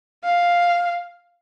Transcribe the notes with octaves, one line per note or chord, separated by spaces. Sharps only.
F5